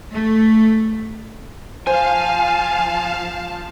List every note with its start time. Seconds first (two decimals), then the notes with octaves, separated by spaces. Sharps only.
0.11 A3
1.87 F3 C5 F5 G#5 A5